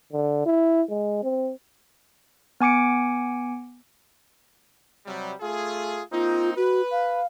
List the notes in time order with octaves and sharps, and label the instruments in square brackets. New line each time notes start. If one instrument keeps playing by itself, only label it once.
[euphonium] D3
E4
G#3
C4
[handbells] B3 G#5 D6 C#7 D7
[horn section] C3 F#3 G3
A3 F4 G#4
[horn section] A#3 C4 D#4 [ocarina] F4
[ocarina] F#4 [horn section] B4
[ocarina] F5